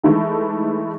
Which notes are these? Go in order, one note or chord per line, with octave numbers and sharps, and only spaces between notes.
E3 G#3 A3 D#4 E4 A4